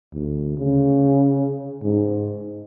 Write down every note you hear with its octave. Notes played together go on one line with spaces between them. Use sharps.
D2
C#3
G#2